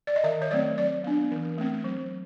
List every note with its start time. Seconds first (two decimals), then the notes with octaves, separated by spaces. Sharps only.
0.07 D5
0.16 D#5
0.24 D#3 E5
0.42 C#5
0.51 F#3 A3 C4 D5
0.78 F#3 D5
1.04 B3 D4
1.31 E3
1.58 A3 C4
1.84 F#3